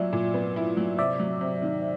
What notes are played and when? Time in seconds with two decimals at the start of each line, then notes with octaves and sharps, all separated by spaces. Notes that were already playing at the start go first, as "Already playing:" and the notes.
Already playing: A#2 F#3 E4 D5 E5
0.13 A#2
0.34 B3
0.56 E4
0.77 F#3
0.98 C3 D5 E5
1.19 F#3
1.41 C3
1.62 D#3